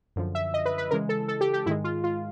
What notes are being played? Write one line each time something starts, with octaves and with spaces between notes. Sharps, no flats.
F#2 D3 F3
E5
D#5
B4
B4
C#3 E3 G#3 A#4
A4
A4
G4
G4
G#2 D#3 G#3 E4
F4
F4